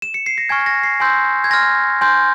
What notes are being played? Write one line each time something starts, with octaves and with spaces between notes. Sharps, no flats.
E7
C#7
C7
A#6
G#5 C#6 F6 G#6
A#6
C7
G#5 C6 E6 G6
G#6
G#5 C6 F6 A#6
G#5 C6 G6